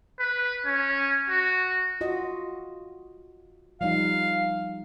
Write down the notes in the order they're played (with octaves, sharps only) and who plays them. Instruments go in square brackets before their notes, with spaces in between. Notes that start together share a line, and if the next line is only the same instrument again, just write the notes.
[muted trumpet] B4
C#4
F#4
[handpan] F4 F#4 D#5
[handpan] F3 G3 D#4 [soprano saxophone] F5